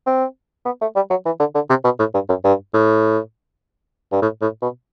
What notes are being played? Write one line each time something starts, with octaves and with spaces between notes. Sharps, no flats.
C4
B3
A3
G3
F#3
E3
D3
D3
C3
B2
A2
G2
F#2
G2
A2
G2
A2
A2
B2